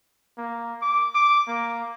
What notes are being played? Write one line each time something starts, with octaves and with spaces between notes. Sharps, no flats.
A#3
D6
D6
A#3